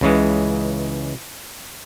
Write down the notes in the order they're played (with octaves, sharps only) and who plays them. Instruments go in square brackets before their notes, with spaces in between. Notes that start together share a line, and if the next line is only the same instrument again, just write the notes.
[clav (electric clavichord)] C#2 C#3 E3 G#3